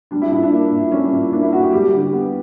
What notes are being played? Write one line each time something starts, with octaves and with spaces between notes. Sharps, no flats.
G3 D4
E4
A#2 E4
D4
A#3
A#2
G3 C#4
A#2
A#3 D4
E4
A#2 F#4
G4
G3 G4
D3 G4
B3